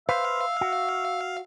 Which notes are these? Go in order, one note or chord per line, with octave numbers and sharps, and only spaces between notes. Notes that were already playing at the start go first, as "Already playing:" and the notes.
B4 C5 E5 F5
F#4